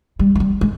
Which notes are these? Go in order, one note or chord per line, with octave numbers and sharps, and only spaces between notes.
G3
G#3
G3
G#3